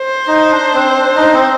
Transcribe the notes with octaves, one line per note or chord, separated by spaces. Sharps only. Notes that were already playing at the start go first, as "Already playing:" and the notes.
Already playing: C5
D#4
D4
C4
D4
D#4
C4